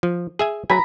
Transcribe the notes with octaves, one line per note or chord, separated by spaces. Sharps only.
F3
G#4 E5 G#5
F#3 G#5 A#5 B5